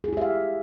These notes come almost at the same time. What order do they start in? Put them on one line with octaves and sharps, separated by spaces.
G#4 E4 G4 E5 F5